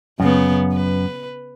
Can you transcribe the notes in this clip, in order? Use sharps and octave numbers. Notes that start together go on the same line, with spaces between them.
F#2 C#3 B3
B4